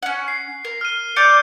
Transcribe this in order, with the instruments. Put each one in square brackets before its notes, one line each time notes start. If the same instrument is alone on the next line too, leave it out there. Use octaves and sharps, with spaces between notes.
[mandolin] C#4 F#5
[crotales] C7
[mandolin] A#4
[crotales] F6 D#7
[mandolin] D5 A#5 D6 [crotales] G6 C#7